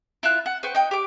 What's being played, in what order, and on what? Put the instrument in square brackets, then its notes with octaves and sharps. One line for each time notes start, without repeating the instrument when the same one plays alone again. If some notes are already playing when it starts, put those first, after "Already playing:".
[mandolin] E4 F4 E5 F#6
F#5
B4 C5 G5 C#6
D#4 G5
G4 D6